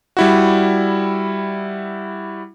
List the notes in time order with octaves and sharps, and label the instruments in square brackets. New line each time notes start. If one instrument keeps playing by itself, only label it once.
[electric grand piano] G3 E4 F#4